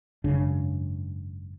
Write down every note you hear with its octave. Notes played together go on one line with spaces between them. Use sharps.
G#1 F#2 C#3 D4